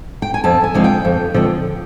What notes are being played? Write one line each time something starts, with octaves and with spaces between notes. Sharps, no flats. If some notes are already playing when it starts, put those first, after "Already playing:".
G5
G#5
F2 A5
G#5
D3 F3 G#3 C4
G5
F2
D3 F3 G#3 C4